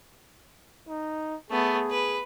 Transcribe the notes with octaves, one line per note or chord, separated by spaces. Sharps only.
D#4
A3 B3 G#4
B4